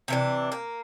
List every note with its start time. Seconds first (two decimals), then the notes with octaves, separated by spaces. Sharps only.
0.08 C3 E3 D4
0.52 A#3